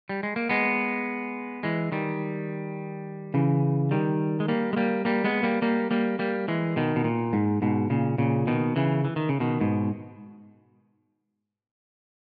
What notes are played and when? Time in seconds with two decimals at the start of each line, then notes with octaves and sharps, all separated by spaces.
0.09 G3
0.23 G#3
0.36 A#3
0.49 G#3 B3
1.63 E3 G#3
1.92 D#3 G3
3.34 C#3 E3
3.91 D#3 G3
4.40 G#3
4.48 G3 A#3
4.73 G#3
4.77 G3 A#3
5.05 G3 A#3
5.24 G#3 B3
5.43 G3 A#3
5.62 G3 A#3
5.91 G3 A#3
6.19 G3 A#3
6.48 E3 G#3
6.76 B2 D#3
6.96 B2
7.04 A#2
7.33 G#2
7.62 G#2 B2
7.90 A#2 C#3
8.18 A#2 C#3
8.47 B2 D#3
8.76 C#3 E3
9.05 E3
9.16 D#3
9.29 C#3
9.40 B2 D#3
9.61 G#2 B2